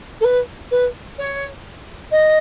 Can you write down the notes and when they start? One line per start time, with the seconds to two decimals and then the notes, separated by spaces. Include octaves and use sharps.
0.20 A4
0.24 B4
0.71 B4
1.18 C#5
2.11 D#5